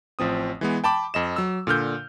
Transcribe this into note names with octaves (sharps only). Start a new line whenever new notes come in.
A1 F3 C4 D#6
E3 G#3 B3
G5 A5 B5 D6
F2 D#5 E7
F#3 E6
A#2 D3 F6 G6